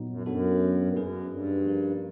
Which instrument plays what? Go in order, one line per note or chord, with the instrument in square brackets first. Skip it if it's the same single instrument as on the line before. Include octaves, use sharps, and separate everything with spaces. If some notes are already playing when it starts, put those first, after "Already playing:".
Already playing: [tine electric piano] A#2 F#3 B3 D#4 F#4
[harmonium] F#2
[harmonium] F#2 [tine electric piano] F#3 B3 D4 F#4 A4
[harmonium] G2
[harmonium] F#2 [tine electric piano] A#3 D#4 G#4 B4
[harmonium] G2
[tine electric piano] F3 A#3 C#4 F#4 A#4